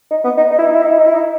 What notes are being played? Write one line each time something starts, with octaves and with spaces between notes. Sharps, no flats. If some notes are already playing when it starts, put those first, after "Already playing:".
D#4
B3
D#4
D#4
E4
D#4
E4
D#4
E4
D#4
E4
D#4